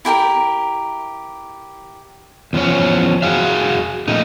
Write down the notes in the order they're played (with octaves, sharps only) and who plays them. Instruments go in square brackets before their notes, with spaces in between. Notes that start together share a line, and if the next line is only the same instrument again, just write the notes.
[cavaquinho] E4 G4 A4 A#4
[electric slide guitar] E2 F3 C#4 C#5
F#4 G#4 E5 F5
F2 A#2 A3 D#4